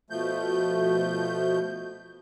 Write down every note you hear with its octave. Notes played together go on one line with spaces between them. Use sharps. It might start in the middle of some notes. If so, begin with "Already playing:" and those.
B2 F3 A3 G6